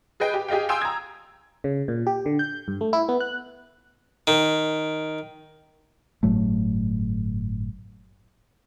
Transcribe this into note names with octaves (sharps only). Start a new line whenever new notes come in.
G#4 B4 D#5 G5
G4
G4 G#4 D#5 F5 G5
F5 G5 G#5 C6 D#6 E6
A#5 G#6
C#3
A#2
G4
D3
G6
G2
A3
E4
B3
F#6
D#3
G1 A2 F#3 A3